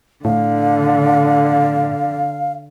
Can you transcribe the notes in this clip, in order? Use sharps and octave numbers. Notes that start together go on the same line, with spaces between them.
A2 D3 F5